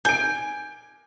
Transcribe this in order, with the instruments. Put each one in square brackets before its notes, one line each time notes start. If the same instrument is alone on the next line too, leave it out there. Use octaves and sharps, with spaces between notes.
[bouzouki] G#5 [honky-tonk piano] G6 D7